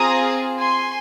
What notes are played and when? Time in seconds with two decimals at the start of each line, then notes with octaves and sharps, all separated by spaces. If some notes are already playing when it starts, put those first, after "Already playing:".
Already playing: C4 F4 G#4 A#5 D#6
0.60 G#5 C6